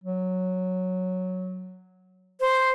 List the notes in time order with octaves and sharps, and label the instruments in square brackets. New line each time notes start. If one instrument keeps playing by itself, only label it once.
[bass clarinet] F#3
[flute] C5